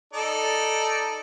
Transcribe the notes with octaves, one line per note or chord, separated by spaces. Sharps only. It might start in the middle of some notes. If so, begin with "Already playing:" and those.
D#4 A4 D5